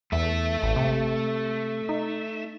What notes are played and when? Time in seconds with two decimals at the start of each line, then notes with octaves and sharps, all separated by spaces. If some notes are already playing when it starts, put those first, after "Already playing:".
0.12 E2 A3 E5
0.62 A1
0.76 C3
1.89 D#4